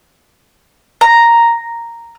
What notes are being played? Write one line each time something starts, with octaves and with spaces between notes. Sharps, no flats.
A#5